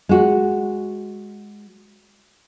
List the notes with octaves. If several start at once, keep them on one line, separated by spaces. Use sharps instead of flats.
G#3 F#4